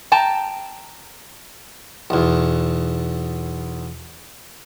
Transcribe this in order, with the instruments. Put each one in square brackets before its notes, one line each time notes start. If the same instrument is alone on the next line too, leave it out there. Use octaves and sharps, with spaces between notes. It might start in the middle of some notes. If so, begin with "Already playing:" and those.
[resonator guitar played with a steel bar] G5 A5 A#5
[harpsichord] B1 E2